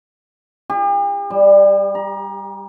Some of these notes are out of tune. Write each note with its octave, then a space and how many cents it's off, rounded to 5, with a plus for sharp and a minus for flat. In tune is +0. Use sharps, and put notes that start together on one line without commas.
G4 +45
G3 +10
A#5 +30